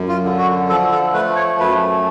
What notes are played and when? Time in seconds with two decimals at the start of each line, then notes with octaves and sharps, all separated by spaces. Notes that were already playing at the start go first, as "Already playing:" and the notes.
Already playing: F#2
0.08 F4
0.24 D3
0.39 F#4
0.69 F3 A4
0.92 A4
1.13 A3 B4
1.36 C#5
1.59 F#2 B4